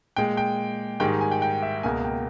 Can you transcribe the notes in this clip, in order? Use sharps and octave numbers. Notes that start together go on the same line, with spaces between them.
A#2 G#3 G5
G5
G#2 D#3 G3 G5
G#5
G5
G5
E5
C#2 B2 A#3 G#5
G5